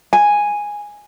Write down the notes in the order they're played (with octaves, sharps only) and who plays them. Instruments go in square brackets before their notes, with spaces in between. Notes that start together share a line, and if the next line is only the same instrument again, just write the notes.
[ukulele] G#5